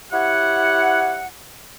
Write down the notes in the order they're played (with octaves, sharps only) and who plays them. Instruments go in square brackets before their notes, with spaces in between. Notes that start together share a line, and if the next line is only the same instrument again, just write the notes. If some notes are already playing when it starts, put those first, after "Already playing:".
[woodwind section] E4 G4 C#5 F#5